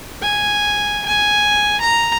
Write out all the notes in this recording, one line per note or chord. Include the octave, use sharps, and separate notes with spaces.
G#5
G#5
A#5